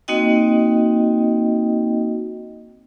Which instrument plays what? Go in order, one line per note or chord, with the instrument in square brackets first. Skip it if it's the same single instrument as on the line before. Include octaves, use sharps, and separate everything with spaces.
[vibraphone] A#3 C4 D#4 F#4 D#5 G5